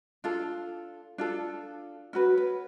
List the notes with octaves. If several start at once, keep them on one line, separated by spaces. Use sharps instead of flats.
D4 F4 A4
D4 F4 A4
C#4 F#4 B4
B4